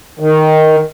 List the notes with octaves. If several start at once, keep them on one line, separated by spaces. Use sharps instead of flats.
D#3